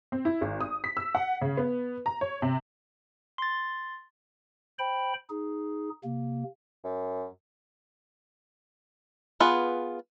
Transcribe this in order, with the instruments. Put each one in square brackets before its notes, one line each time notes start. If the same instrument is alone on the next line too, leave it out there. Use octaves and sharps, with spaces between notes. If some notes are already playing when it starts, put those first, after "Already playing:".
[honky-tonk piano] C4
E4
G#1
D#6
B6
E6
F#5
C#3
B3
A#5
C#5
C3
[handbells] C6 A6
[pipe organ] C5 G5 B5
D#4 G#4
C3 A#3
[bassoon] F#2
[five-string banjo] B3 F4 G#4 B4